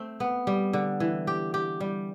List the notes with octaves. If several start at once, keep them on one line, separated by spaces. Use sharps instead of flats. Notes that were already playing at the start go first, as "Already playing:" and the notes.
Already playing: A3 C4
B3
G3
D3
E3
G4
G4
G3